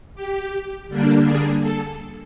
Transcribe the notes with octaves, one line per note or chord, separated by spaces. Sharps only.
G4
D3 G3 A#3 D4
G#4
A4